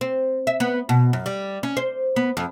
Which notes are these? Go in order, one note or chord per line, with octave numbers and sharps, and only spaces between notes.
C4
E5
B3
B2
F#2
G3
C#4
C5
B3
F2